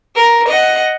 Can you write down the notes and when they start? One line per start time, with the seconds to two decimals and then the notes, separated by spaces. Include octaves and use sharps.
0.15 A#4
0.47 D#5 F#5